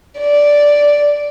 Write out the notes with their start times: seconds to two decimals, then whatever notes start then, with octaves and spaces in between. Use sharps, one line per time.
0.19 D5